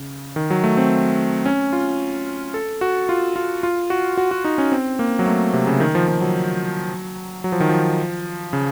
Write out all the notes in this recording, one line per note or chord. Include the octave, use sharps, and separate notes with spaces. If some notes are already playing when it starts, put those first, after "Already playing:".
Already playing: C#3
D#3
F#3
A3
C4
C#4
F4
A4
F#4
F4
F4
F4
F#4
F#4
F#4
D#4
C#4
C4
A#3
F#3
A3
C3
C#3
D#3
F3
F3
F#3
F#3
F3
D#3
F3
C#3